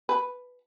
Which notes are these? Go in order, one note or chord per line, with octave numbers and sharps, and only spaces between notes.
B4